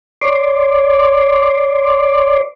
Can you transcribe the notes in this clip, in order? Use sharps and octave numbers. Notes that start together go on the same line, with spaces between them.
C#5 D5 C6 D6